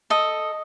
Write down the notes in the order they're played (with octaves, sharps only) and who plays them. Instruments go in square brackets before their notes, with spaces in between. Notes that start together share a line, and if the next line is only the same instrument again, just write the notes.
[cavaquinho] A4 D#5